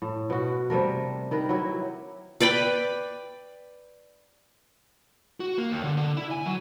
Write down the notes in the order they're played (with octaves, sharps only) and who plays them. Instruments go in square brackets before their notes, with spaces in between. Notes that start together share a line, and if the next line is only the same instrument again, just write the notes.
[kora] A2
B2 F#4
C3 G3 A3 A#4
D#3 A#4 B4
F#3 E4 G4
[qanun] B4 D5 G5 B5
[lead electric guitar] F#4
A#3
D#2
D3
D3
E4
G#5
F#3